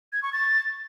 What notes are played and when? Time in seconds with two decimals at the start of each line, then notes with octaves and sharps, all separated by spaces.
0.13 G#6
0.23 C#6
0.33 A6